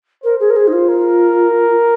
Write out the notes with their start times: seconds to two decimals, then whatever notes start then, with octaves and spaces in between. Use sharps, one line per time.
0.24 A#4 C5
0.40 G#4
0.50 A#4
0.56 G#4
0.68 D#4
0.73 F4
0.89 A#4